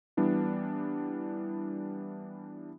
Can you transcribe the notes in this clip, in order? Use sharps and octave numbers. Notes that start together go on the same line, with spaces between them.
E3 G3 B3 D4 E4